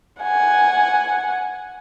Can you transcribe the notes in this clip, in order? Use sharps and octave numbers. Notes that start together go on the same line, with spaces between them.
F#5 G#5